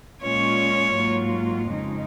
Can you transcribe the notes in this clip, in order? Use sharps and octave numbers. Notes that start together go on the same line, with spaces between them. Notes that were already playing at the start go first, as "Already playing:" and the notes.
A#2 G#3 C#4 F4 C#5
G#2 F#3 A#3 F4
F2 C#3 G#3 D#4